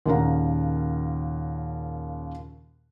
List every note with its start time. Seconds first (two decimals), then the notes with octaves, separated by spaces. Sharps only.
0.06 D#2 A#2 C#3 F5 F#5 A#5